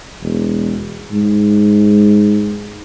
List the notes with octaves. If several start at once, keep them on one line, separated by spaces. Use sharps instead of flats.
E1
G#2